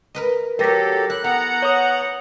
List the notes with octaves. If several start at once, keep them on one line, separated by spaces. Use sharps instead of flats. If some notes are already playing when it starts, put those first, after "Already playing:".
A#4 B4 D#5
F#3 A3 G4 A4 A#4 D5 A#6 B6
E4 F#6
B3 E4 F#5 A#5
C#5 D#6